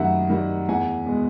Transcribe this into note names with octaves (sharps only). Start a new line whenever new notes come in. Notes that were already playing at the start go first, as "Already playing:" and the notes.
Already playing: F#2 D#3 G3 E5 F#5
D#3 G3
E2 F#5 G#5
B2 G#3